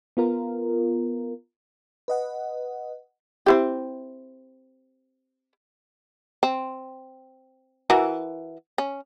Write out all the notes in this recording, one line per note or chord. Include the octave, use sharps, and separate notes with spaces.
B3 F4 A#4
B4 D#5 F#5
C4 E4 G4
C4
E3 F#4 A#4
C#4